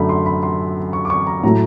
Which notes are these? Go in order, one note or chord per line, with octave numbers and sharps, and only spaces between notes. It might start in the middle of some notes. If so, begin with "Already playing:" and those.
Already playing: F#2 D3 F#3 A3 A#5 B5
C6
B5
C6
C#6
D6
C#6
A#5
A2 F#3 A3 A#5